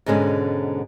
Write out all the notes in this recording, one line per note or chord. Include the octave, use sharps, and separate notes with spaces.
G#2 B2 D3 G#3 C#4